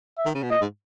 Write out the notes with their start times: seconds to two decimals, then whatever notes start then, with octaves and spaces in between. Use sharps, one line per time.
0.18 E5
0.26 D#3
0.34 C#3
0.42 B2
0.51 A#2 D#5
0.61 G#2